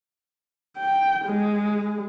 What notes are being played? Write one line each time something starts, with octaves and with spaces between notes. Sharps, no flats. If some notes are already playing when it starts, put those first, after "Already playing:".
G5
G#3